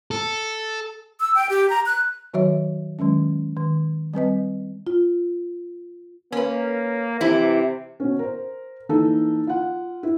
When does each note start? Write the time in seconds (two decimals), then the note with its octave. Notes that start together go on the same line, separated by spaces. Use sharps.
0.11 A4
1.20 E6
1.35 G5
1.50 G4
1.70 A#5
1.86 F#6
2.34 D#3 F#3 F#4 C#5 E5
2.99 D#3 F#3 G#3 C#4
3.57 D#3
4.14 G3 C4 B4 D#5
4.87 F4
6.32 A#3 C#4 B4
7.21 C3 E3 E4
8.00 B2 C#4
8.19 A#4 C5
8.89 E3 A#3 D#4 A4
9.47 F4 F#5
10.03 E4